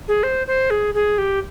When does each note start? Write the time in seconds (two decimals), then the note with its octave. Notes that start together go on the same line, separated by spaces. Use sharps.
0.08 G#4
0.23 C5
0.47 C5
0.70 G#4
0.94 G#4
1.18 G4